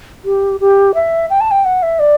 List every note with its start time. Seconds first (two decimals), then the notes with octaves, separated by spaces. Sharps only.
0.25 G4
0.60 G4
0.95 E5
1.30 G5
1.41 A5
1.51 G5
1.65 F#5
1.83 E5
1.99 D5